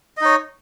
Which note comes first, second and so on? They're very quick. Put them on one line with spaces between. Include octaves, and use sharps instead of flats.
D#5 D#4 C#5